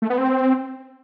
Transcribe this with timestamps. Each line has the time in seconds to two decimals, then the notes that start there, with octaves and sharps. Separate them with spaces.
0.02 A3
0.10 B3
0.18 C4